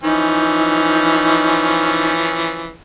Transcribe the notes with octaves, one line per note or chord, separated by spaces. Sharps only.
E3 F3 C#4 D#4